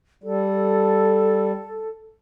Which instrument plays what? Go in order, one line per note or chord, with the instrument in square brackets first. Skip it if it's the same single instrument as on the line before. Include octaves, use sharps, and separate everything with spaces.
[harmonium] G3 [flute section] A4